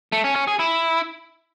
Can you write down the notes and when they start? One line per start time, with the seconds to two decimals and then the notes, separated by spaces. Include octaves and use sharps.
0.12 A3
0.24 C#4
0.36 C#4
0.47 G#4
0.59 E4